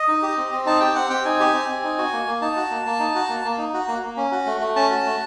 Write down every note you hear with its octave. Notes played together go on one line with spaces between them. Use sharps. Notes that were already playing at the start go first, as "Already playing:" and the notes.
Already playing: D#5
D#4
G4
C4
C4
D#4 A5
G4 G5
C4 F#5
C4 G5
D#4 G#5
G4
C4
C4
D#4
F#4
A#3
A#3
D#4 A5
F#4
A#3
A#3
D#4
F#4
A#3
A#3
D#4
F#4
A#3
A#3
C#4
F#4
A3
A3
C#4 A5
F#4
A3